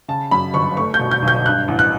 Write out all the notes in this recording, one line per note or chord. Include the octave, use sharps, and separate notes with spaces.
C#3 A5
F#2 B5
G1 C#6
A3 C#6
G6
B2
G6
B1
G6
G2 F#6
A1
F#6